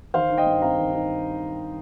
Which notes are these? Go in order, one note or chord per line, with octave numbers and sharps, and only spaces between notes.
D#3 C5 F5
D#4
D#5 G5
G2
C4 F5 A#5
D#3
D#4